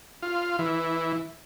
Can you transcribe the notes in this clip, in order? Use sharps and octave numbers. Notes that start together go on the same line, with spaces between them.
F4
E3